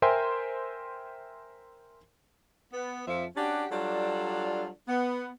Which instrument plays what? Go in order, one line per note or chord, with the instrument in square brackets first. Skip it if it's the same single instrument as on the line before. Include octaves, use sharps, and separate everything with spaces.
[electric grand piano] A#4 C5 E5 G5 G#5 C6
[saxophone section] B3
F2 F3 E5
C#4 D4 F#4 G4
F#3 G3 D4 F4 A4 D5
B3